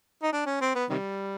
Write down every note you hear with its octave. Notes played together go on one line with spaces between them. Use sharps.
D#4
D4
C#4
C4
B3
C3 D#3 G3